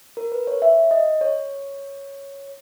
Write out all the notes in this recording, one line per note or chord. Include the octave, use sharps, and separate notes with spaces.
A#4
B4
C#5
E5
D#5
C#5